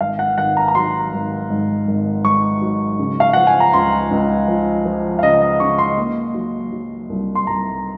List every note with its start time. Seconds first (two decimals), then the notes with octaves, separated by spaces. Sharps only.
0.01 G#1 F5
0.19 F#5
0.38 G#1 F#5
0.57 A#5
0.68 A#5
0.75 F#3 C6
1.12 G#1
1.50 G#2
1.87 G#1
2.24 G#2 C#6
2.62 F#3
2.99 C#3
3.20 F5
3.33 F3 F#5
3.47 G#5
3.60 A#5
3.73 C#2 C6
4.11 C#2
4.48 F3
4.85 F3
5.19 F5
5.23 C#3 D#5
5.42 D#5
5.60 C#3 C#6
5.78 C6
5.98 A#3
6.34 F#3
6.72 F#3
7.09 C2
7.35 C6
7.47 C2 A#5